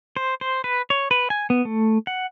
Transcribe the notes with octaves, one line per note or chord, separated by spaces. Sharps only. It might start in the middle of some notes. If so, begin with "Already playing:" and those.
C5
C5
B4
C#5
B4
G#5
B3
A3
F#5